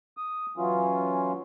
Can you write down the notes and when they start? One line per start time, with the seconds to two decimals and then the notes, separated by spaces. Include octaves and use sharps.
0.17 D#6
0.57 E3 F#3 C#4 F4